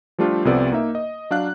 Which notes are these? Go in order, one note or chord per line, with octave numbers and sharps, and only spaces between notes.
F3 G3 A3 D4 F4 G4
C2 C3 F3 B3 A4 D5
A#3 D#4 E5
D#5
F#3 D4 F5 F#6